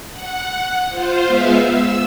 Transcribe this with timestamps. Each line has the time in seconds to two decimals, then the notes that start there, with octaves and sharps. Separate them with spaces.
0.12 F#5
0.89 F4 C5
1.27 G#3 B3 E5 F5
1.60 E6